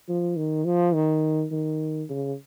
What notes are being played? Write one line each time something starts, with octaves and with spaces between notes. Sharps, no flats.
F3
D#3
F3
D#3
D#3
C#3